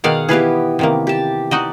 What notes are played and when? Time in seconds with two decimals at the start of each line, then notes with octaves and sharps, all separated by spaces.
0.04 B2 D#3 G#4 D5 F5 F#5
0.29 E3 B3 G4 G#4 B4 F5
0.79 C3 D#3 A#3
1.07 G4 A5
1.51 D#4 F#4 D5 D#5